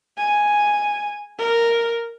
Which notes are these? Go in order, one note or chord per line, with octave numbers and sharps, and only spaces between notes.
G#5
A#4